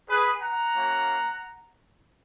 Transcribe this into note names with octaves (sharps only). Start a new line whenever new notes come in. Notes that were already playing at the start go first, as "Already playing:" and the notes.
G#4 B4
F#5 A#5
A#3 C#4 F#4